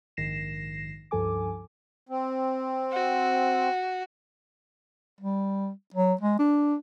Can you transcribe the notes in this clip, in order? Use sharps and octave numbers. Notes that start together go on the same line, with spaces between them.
A#1 G#2 D#3 A#6 C7 E7
C#2 G2 F3 A4 G#5 D6
C4
F#4
G3
F#3
G#3
D4